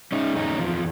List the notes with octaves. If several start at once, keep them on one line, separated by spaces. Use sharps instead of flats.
G#3 C#4 D#4
E2 C#4 D#4
F3